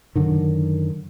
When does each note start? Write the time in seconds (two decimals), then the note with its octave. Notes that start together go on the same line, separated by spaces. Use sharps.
0.16 F#2 D3 D#3